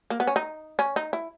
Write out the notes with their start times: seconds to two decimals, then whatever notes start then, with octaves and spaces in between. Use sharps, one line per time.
0.10 A#3
0.20 B3
0.27 C#4
0.36 D#4
0.79 C#4
0.96 D#4
1.13 E4